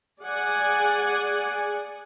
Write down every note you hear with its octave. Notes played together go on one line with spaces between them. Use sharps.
G#4 D5 F#5 G#5